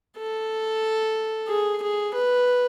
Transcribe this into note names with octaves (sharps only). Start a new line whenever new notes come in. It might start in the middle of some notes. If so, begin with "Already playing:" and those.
A4
G#4
G#4
B4